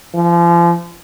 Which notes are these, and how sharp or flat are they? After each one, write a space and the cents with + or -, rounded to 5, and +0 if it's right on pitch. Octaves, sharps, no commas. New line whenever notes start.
F3 -35